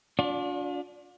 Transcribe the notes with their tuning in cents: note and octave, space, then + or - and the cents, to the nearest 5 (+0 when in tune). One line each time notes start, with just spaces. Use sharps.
D4 -30 F4 +45 D5 +0